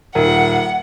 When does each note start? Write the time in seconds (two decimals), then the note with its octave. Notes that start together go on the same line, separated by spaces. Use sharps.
0.15 D#1 A#4 F#5